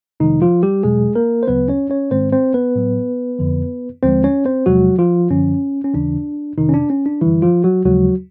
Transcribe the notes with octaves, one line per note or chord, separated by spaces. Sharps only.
F2 C3 D#3 F3 G#3 D#4
F3 F4
G3 G4
E2 B2 F#3 G#3 G#4
A#3 A#4
C5
D2 C#3 F#3 B3 B4
C#4 C#5
C#4 C#5
G#2 D#3 G#3 C4 C5
C4 C5
B3 B4
A2 F#3
F2 D3 F3
D#2 D3 F3 G#3 C4 C5
C#4 C#5
C4 C5
E2 C3 F3 F#3 G#3 F#4
F3 F4
F#2 D3 F3 C#4
C#4
D#2 C#3 E3 D4
F2 C3 D#3 D#4
C#4
D4
C#4
D4
F#2 D3 E3 G3 E4
F3 F4
F#3 F#4
D#2 C#3 F3 F#3 G#3 F#4